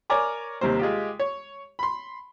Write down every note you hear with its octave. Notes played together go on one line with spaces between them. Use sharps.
A#4 C#5 D5 G#5 A#5 D6
D#2 C3 G3 A#3 C5
G#3 F4 G4
C#5
B5 C6